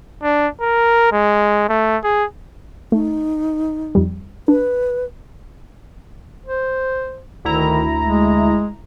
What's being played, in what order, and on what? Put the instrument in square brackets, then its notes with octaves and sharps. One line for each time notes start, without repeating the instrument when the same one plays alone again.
[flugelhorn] D4
A#4
G#3
A3
G#4
[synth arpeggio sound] A3 [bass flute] D#4
[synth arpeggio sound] F2 G3
[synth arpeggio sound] D4 [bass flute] B4
[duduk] C5
[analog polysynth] D2 E4 A#5 [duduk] D#3
[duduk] G#3